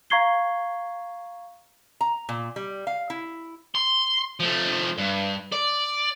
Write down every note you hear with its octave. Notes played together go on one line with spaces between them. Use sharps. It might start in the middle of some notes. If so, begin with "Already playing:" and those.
F5 A#5 C#6 G#6 C7 G7
A#5
A#2
G3
F5
E4
C6
F3 A3
G2
D5